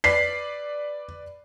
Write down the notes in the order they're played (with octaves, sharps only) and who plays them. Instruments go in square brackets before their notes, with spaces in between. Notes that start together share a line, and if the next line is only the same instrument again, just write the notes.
[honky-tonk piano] B4 D5 [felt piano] B6 C7